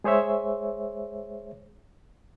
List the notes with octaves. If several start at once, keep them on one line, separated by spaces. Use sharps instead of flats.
G#3 G#4 C5 C#5 E5